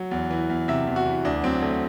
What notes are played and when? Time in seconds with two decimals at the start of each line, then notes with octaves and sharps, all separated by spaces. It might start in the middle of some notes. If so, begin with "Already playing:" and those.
Already playing: F#3 F#5
0.11 E2
0.30 E3
0.50 E2
0.68 C3 E5
0.87 E2
0.96 F#4
1.06 E3
1.25 D2 D4
1.43 F#3 C4
1.62 D2 A3